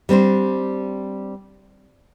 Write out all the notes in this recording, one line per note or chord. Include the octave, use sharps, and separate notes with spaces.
G3 C4 D4 C5